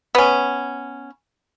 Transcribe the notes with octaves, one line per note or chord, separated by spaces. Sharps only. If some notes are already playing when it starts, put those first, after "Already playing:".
B3 C#4